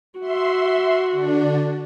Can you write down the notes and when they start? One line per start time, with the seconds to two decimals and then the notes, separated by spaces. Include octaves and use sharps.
0.20 F#4 E5 C6
1.12 D3 D4